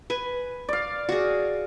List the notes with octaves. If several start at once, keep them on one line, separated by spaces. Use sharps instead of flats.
B4 G#5
D5 F5
F#4 G#4